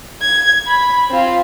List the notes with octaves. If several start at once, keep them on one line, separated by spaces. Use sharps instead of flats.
G#6
B5
C4 F4